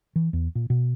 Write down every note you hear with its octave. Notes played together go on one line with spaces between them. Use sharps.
E3
E2
A#2
B2